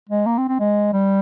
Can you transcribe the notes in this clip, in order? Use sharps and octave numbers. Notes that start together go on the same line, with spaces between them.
G#3
A#3
C4
C4
G#3
G3